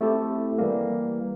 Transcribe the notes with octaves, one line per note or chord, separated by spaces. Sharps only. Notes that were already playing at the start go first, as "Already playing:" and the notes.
A3 C4 E4 G4 A4
E3 G3 A#3